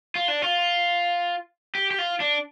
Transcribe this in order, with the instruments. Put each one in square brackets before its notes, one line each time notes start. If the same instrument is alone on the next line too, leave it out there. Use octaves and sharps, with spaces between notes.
[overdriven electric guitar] F4
D4
F4
G4
G4
F4
D4